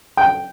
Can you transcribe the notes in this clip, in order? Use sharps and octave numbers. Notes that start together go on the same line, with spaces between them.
G5